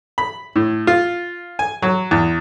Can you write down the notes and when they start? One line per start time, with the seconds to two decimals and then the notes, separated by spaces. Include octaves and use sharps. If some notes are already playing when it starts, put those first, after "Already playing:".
0.18 B5
0.56 A2
0.87 F4
1.59 G#5
1.82 F#3
2.11 E2